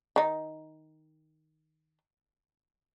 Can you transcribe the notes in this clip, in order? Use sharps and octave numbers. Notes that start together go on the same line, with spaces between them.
D#3 D#4